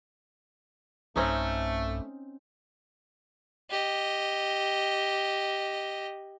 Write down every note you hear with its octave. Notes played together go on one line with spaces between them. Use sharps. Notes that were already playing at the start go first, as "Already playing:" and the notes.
B1 G2 A3 C4 C#4 D#4
G4 D#5